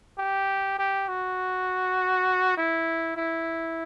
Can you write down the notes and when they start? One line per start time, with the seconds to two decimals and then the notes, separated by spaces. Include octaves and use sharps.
0.18 G4
0.79 G4
1.08 F#4
2.57 E4
3.17 E4